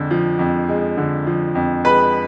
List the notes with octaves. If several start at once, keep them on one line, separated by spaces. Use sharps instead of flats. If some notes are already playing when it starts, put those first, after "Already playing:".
Already playing: F2 D3 G#3
F3
F2
G#3
D3
F3
F2
G#3 B4 B5